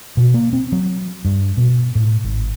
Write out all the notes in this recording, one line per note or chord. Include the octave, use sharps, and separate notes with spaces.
B2
A#3
C4
F#3
G2
B2
A2
G#1